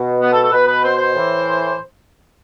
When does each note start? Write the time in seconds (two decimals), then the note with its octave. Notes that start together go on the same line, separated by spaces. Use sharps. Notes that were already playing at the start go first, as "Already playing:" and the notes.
Already playing: B2
0.22 B3
0.32 A4
0.42 A4
0.52 B2 B4
0.67 B4
0.83 C5
0.98 C5
1.14 A2 E3